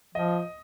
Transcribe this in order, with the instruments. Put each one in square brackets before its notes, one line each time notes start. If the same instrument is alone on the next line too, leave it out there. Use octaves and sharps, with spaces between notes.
[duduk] F3 [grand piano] D#5